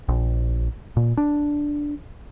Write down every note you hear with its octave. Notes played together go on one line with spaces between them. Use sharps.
A#1
A#2
D4